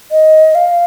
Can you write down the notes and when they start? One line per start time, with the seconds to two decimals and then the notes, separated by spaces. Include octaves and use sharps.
0.11 D#5
0.55 F5